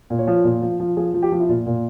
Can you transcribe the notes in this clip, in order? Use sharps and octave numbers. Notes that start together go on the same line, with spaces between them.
A#2
C#5
F3
A#2
F3
F3
F3 G#4
F3
G4
F3
E4
A#2 F4
A#2